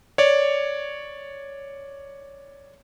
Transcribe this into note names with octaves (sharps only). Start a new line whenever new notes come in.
C#5 D5